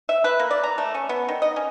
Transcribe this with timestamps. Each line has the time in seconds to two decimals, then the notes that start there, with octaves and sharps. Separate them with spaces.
0.09 E5
0.24 B4
0.39 A#3
0.51 D5
0.64 A#5
0.78 A3
0.95 C#4
1.09 B3
1.28 D#3
1.42 D#5
1.56 C#4